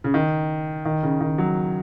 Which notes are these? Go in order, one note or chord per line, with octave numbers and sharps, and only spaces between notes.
C#3
D#3
D#3
C#3
D#3
F#3